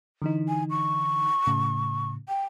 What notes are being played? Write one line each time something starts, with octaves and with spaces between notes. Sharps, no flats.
D3 E3 D#4
G#5
C#6
A2 C#3
G5